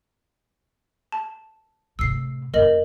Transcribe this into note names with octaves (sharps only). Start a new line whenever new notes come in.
A5
A2 C3 E6 C7
F#1 A#4 D#5 F#7